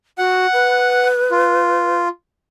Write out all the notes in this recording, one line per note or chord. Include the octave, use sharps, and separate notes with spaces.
F#4 F#5
B4
F4